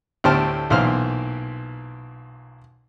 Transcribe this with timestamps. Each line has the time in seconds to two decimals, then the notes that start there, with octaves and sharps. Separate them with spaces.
0.24 D2 A2 G4 C5 A5 F6
0.70 B1 A#2 E3 C5 F5 F6